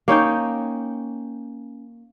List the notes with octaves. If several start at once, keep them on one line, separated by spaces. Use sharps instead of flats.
A#3 C#4 D#4 G5